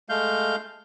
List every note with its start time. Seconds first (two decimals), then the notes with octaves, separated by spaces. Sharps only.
0.09 G#3 A3 F5 G6